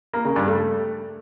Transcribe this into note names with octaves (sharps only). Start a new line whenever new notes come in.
A#3
C#3
G2
A3